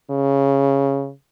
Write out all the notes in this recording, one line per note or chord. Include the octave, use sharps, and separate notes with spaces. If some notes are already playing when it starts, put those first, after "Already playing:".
C#3